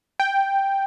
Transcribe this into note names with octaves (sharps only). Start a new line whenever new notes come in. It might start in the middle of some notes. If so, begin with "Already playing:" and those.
G5